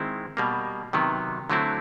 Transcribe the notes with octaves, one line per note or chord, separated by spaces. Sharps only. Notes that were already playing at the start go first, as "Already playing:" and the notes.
Already playing: D#3 G#3 C4 E4
B2 G3 A#3
C3 D#3 F#3 B3
D3 F#3 A3 C4 E4